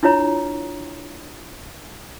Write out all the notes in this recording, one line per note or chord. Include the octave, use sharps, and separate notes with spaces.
D4 E4 F4 C#5 A#5